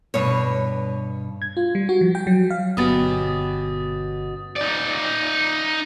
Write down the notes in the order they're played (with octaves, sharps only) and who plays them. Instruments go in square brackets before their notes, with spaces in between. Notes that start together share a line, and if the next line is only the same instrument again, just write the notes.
[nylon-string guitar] G2 B2 C#5
[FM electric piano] G#6
F4
G3
F#4
F3
G5
F#3
F5
[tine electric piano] G1 C#4 [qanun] B2 B3 G4 [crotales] D#6 A6
[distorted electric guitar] D#4 D5